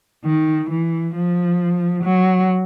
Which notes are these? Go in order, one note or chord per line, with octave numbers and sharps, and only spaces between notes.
D#3
E3
F3
F#3